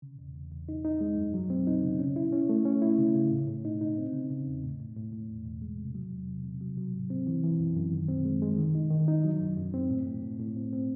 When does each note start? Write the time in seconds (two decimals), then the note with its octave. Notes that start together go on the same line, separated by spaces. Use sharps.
0.02 C#3
0.19 E2
0.35 E2
0.52 E2
0.69 D#4
0.85 D#4
1.01 G#3
1.18 F#2
1.34 F#3
1.50 C4
1.67 D#4
1.84 C#3
1.99 C#4
2.16 E4
2.33 C#4
2.49 A3
2.65 C#4
2.82 E4
2.98 C#3
3.15 C#3
3.32 A2
3.47 A2
3.65 D#4
3.81 D#4
3.98 C4
4.13 C#3
4.30 C#3
4.47 E2
4.64 A2
4.80 A2
4.96 A2
5.13 A2
5.29 E2
5.46 E2
5.62 G#3
5.78 C3
5.95 F#3
6.11 E2
6.28 C3
6.44 C3
6.61 F#3
6.77 F#3
6.93 G#2
7.10 C4
7.27 E3
7.44 E3
7.59 F#2
7.76 F#2
7.93 D#3
8.09 C4
8.25 G#3
8.42 G#3
8.58 D#3
8.75 D#4
8.91 D#3
9.08 D#4
9.25 F#3
9.41 F#2
9.57 F#2
9.74 C4
9.91 A2
10.06 A2
10.23 A2
10.40 A2
10.56 C4
10.73 C4